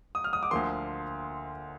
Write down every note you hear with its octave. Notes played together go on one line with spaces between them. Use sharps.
D#6
F6
D#6
D6
D2 D3 F3 A#3 C6